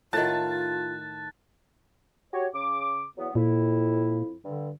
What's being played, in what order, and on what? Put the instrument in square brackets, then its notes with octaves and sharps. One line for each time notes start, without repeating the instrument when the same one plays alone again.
[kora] A2 D#3 [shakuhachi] F4 [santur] A5 [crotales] F#6 A6
[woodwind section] F#4 G4 C#5
C#3 D6
E2 F#3 B3
[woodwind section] F2 E4 [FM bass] A#2
[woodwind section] G2 D3